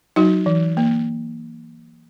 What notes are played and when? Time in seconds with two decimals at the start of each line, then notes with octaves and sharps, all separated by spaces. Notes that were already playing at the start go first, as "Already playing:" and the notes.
0.16 F#3 D#4 F#4
0.46 E3
0.77 A#3